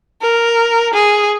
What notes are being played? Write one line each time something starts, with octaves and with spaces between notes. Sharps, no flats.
A#4
G#4